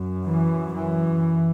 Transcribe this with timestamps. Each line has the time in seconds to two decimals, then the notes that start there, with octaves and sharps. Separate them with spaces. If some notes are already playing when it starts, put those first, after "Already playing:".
Already playing: F#2
0.27 E3
0.74 E3